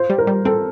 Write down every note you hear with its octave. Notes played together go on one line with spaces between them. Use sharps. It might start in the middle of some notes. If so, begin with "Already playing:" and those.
Already playing: F4 C5
G3
A#4
G3
C4 A4